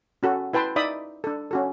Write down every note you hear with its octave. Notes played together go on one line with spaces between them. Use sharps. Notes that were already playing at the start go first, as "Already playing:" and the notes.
C#4 F#4 A4
E4 B4 G5 A5 C6
D#4 D5 E5 B5 D#6
D4 A4
C#4 F#4 A4